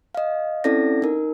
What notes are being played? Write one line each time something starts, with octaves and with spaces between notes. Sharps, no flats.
D#5 F5
C4 C#4 E4 A4 D5 A#6
D#4 A#4